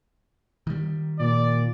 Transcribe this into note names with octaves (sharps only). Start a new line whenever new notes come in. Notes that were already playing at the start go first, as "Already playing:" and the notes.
D#3 G3
A#2 D5